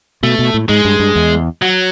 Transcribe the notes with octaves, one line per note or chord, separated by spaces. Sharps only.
B2 A3
B2
A2
G#2 G#3
G2
G2
E2
F#3